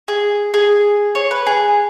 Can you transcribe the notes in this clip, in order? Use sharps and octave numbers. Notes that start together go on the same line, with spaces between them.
G#4
G#4
C#5
B4
G#4